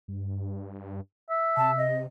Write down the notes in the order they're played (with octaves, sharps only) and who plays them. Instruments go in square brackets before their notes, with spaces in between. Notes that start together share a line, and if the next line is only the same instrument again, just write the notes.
[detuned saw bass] G2
[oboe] E5
[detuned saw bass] C3 [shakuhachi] A5
[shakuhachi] D#5